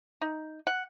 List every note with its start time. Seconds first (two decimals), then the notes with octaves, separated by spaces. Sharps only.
0.21 D#4
0.67 F#5